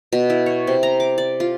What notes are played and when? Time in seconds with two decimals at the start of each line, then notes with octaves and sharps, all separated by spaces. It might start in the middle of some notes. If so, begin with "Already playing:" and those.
0.13 B2
0.30 E4
0.46 C#5
0.67 C3
0.83 A#5
1.00 D6
1.18 D5
1.40 F4